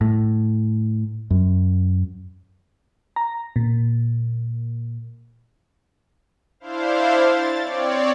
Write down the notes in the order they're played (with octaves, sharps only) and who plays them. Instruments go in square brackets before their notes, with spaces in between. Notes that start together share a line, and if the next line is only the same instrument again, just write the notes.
[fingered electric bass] A2
F#2
[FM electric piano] A#5
A#2
[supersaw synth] D4 E4 C5 F5
A6
C4 C#5 D5